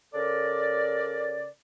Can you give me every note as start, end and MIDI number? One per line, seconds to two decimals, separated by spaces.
0.14 1.49 49
0.14 1.49 69
0.14 1.49 70
0.14 1.49 74